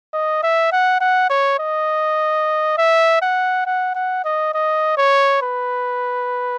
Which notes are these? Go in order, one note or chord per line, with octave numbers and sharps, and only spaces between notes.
D#5
E5
F#5
F#5
C#5
D#5
E5
F#5
F#5
F#5
D#5
D#5
C#5
B4